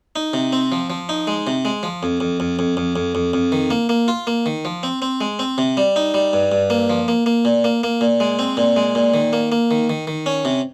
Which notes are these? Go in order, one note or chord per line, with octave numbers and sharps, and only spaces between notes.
D#4
C3
C4
F3
F3
D#4
G#3
C3
G#3
F3
F2
F2
F2
F2
F2
F2
F2
F2
D#3
A#3
A#3
F4
A#3
D#3
F3
C4
C4
G#3
C4
C3
G3
D#4
G3
G2
G2
A#3
F3
A#3
A#3
A#2
A#3
A#3
A#2
G#3
C4
A#2
G#3
A#2
D#3
A#3
A#3
D#3
D#3
D#3
C#4
C3